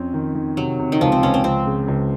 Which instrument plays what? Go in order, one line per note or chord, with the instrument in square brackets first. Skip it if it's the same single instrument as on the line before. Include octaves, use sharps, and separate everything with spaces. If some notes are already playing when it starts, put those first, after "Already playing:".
Already playing: [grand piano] F2 C4 C#4
D#3
D#3
[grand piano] C3 [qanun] F#3
[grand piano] C3
[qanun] D#3
[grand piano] C#2 [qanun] F3
[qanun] C4
[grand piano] C#2 [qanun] C#4
[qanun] C4
[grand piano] C#2 [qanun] C4
[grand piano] C#3
C#2